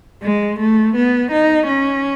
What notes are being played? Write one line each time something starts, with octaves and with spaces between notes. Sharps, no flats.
G#3
A3
B3
D#4
C#4